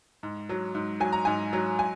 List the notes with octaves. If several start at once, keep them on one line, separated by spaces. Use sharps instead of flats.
G#2
F#3
G#2
F#3 G#5
A#5
G#2 G#5
F#3
G#5